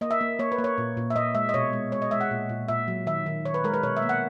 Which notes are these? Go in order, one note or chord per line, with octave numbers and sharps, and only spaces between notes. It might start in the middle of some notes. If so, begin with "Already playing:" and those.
A#3 D#5
E5
A#3
A#3 C#5
B4
A#3
C#5
A#2
A#2
E5
A#2 D#5
G#3 E5
D#5
B2 C#5
G#3
G#3 C#5
D#5
G#3 E5
F#5
A#2
A#2
A#2 E5
F#3
D#3 E5
D#3
D#3 C#5
B4
G#3 A#4
B4
B2 C#5
E5
A#3
F#5